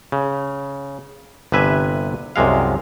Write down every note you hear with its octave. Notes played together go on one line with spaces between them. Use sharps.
C#3
G1 C3 B4 E5 G#5
C2 F#2 C3 G#3 F5